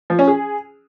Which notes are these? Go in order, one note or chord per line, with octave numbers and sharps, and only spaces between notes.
F3
C#4
G#4